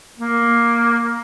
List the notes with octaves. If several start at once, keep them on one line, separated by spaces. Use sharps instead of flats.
A#3